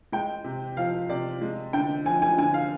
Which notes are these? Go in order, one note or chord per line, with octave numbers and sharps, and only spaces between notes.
G#3 G5
C3
F3 F5
C3 D5
G#3
D3 G5
F3 G#5
G#5
D3 G#5
F5